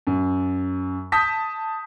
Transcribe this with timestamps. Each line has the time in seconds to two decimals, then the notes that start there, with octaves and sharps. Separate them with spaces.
0.07 F#2
1.12 A5 D#6 G6 B6